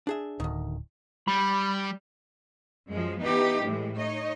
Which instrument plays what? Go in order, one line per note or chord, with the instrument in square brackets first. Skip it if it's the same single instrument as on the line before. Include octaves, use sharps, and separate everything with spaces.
[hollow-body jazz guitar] D4 G#4 E5
[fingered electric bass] D1 [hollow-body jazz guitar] D2 D#3
[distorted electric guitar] G3 [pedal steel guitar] B5
[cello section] F#2 F3 G#3
E3 B3 D#4 G4
A2 E3 G#3
D#4 C#5 D#5